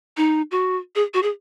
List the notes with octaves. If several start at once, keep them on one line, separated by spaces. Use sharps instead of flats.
D#4
F#4
G#4
F#4
G#4